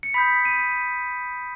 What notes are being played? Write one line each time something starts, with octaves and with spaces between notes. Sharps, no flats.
C#7
B5 D#6 G6 B6
D#7